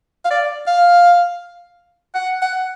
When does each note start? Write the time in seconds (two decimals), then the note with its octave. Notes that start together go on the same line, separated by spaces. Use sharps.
0.25 F5
0.31 D5
0.67 F5
2.15 F#5
2.42 F#5